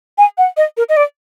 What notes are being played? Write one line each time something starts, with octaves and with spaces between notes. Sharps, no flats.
G#5
F#5
D#5
A#4
D#5
D5